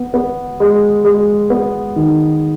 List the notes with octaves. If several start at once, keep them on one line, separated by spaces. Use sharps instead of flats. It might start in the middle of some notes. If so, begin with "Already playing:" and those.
Already playing: B3
B3
G#3
G#3
B3
D#3